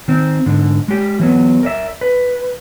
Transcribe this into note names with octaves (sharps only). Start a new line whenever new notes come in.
D#3 C4
G#2 D3
G#3 G4
E3 F#3 B3
A#4 D5 E5
B4